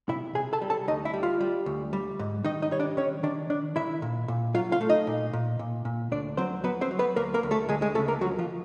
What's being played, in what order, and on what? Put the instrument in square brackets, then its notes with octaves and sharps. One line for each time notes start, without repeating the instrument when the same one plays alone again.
[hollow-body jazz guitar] C3 E4 E5
C3 G#4 G#5
A4 A5
G3
A4 A5
D2 D#4 D#5
E4 E5
G3
F4 F5
G3
D2
G3
G#2
D#3 D#4 D#5
D#4 D#5
G3 C#5
D4 D5
D#3 C#4 C#5
D#3 D4 D5
D#3 D4 D5
D#3 E4 E5
A#2
A#2
F#3 F4 F5
F4 F5
A3
D#4 D#5
A#2
A#2
A#2
A#2
D2 D4 D5
F#3 C4 C5
F#3 B3 B4
C4 C5
F#3
B3 B4
D2 A#3 A#4
A#3 A#4
D2
A3 A4
D2 G#3 G#4
G#3 G#4
C#3 A3 A4
A#3 A#4
F3 F#3 F#4
F3 F4